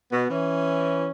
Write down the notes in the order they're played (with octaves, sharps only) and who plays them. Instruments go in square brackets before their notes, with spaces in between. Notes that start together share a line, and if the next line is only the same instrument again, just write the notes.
[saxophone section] B2 [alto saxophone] B3
[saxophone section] E3 [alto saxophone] C#4